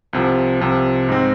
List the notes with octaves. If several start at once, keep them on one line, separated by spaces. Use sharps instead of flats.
C2 C3 F3
C2 C3 F3
G#2 G#3 C4